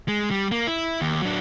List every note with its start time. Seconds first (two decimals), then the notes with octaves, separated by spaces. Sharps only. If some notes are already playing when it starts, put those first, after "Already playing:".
0.08 G#3
0.31 G3
0.52 A#3
0.67 E4
1.01 D#2
1.22 F#3 D4